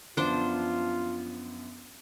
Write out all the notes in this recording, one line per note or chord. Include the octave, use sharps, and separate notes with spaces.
F#2 F3 B3 D4 F4 C5